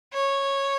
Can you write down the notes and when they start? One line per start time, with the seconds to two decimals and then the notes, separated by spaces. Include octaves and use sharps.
0.13 C#5